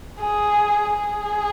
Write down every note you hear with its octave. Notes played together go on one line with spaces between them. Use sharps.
G#4
G#4